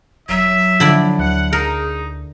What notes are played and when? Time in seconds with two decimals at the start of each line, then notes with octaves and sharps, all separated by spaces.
0.29 E1 F#3 E5
0.80 D3 F3 E4 D5
1.19 D2 F#5
1.53 D#4 G#4 A#4